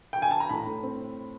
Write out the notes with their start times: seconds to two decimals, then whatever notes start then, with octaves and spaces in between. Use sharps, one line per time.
0.13 G5
0.22 G#5
0.31 A5
0.40 A#5
0.49 A2 B5
0.67 A3
0.83 C4